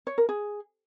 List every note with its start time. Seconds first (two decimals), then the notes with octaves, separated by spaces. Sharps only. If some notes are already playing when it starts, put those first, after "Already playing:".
0.07 C#5
0.18 A#4
0.29 G#4